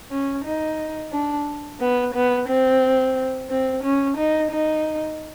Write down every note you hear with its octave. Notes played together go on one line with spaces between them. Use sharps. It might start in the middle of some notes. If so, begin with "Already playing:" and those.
C#4
D#4
D4
B3
B3
C4
C4
C#4
D#4
D#4